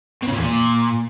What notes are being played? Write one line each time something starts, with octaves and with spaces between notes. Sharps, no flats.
B2
C#3
A#2
E2
A#2